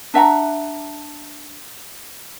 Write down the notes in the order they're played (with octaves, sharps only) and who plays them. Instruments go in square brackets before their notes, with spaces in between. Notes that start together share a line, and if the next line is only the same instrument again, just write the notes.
[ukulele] D4 E5 F#5 A#5